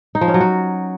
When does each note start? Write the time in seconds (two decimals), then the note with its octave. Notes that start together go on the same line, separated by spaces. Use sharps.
0.15 D#4
0.21 F3
0.28 C#4
0.34 F#3
0.41 F#4